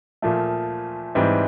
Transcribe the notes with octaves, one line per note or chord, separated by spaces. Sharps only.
A#2 F3 A3
G#2 E3 G3 C4